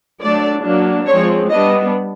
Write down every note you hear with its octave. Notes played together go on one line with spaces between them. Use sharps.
F#3 A3 D4 D5
F#3 A#3 D4
F3 G#3 C4 C#5
G3 B3 D4 D#5